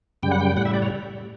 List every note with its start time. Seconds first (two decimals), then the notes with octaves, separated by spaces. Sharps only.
0.23 F#2 C#3 G3 G5
0.31 F#5
0.41 G5
0.57 A2 G3 F#5
0.65 E5
0.74 D5
0.82 C#5